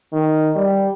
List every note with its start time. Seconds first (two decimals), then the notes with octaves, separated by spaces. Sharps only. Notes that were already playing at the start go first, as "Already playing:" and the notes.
0.13 D#3
0.55 G3